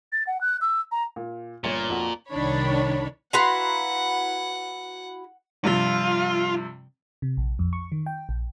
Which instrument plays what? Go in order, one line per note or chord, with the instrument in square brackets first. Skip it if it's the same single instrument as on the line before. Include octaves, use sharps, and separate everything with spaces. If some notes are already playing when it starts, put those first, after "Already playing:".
[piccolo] A6
F#5
F#6
E6
A#5
[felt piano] A#2
[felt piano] G1 C#5 C#7 [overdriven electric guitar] A#2
[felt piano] F2 F#4
[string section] C2 D#3 D4 C#5 B5
[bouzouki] E4 F#4 F5 [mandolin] B4 A#5 C6 [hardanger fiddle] F#5
[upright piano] G2 C3 F3 [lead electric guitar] F4
[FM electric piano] C3
A#1
F2
C#6
D#3
G5
A#1